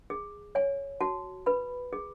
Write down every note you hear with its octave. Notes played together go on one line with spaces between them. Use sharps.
G#4
C#5 G#5
F#4 A5
B4 B5
G#4